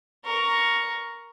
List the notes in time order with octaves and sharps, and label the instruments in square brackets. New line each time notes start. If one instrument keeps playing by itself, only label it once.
[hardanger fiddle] A#4 C#6